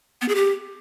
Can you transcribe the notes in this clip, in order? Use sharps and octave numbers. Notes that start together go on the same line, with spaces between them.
B3
G#4
G4